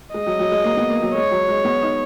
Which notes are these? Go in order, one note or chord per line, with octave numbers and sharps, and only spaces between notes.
G#3 D#5
F#3
F#3
G#3
A#3
B3
A#3
F#3
G#3 C#5
F#3
G#3
B3
D#4